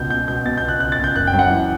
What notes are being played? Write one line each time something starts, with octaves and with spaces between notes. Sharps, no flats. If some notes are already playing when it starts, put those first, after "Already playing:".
Already playing: C#2 B2 G6
B2 G6
B2 G6
B2 A6
G6
C#2
F#6
C#2 F#6
A6
C#2
G6
F#1 F#6
G5
F#2
F#5
E3